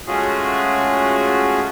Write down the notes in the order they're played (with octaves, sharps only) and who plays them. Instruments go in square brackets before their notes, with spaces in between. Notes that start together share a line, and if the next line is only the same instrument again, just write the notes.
[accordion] G#3 A3 C#4 F4 F#4 G#4